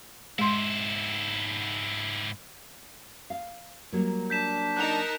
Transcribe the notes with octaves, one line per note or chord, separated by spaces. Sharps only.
G#2 G#3 E4 C6
F5
F#3 G3 A#3
D4 G6 B6 E7
D#4 A#4 A5 F#6 F7